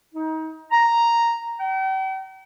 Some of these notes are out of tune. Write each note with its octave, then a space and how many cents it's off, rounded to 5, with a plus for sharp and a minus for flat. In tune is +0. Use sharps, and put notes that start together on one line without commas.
D#4 +30
A#5 +0
G5 -40